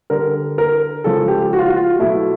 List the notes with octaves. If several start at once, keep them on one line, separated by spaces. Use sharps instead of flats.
D3 G3 A#4
A#4
C#3 F3 G#3 A4
G4
F#4
F4
F#4
F4
B2 F#3 A3 E4